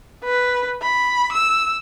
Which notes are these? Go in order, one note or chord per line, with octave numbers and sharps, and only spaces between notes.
B4
B5
E6